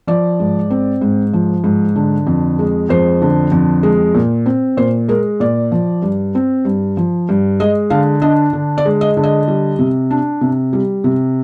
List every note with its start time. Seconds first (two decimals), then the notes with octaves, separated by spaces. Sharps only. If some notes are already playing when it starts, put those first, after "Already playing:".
0.07 F3 D5
0.40 G#2
0.70 C4
1.01 G#2
1.33 F3
1.64 G#2
1.96 D3
2.27 F2
2.59 G#3
2.89 F2 C5
3.22 D3
3.52 F2
3.83 G#3
4.14 A#2
4.46 C4
4.77 A#2 C5
5.08 G#3 A#4
5.40 A#2 D5
5.71 F3
6.02 G2
6.35 C4
6.65 G2
6.97 F3
7.29 G2
7.60 G#3 D#5
7.90 D3 F5
8.22 D4 D#5
8.53 D3
8.78 D5
8.85 G#3
9.01 D#5
9.17 D3
9.23 D#5
9.48 G3
9.79 C3
10.11 D4
10.41 C3
10.73 G3
11.04 C3